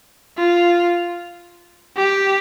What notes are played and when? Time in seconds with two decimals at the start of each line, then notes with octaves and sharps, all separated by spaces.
0.38 F4
1.97 G4